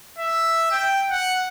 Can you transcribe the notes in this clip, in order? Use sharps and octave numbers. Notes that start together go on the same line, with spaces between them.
E5
G5
F#5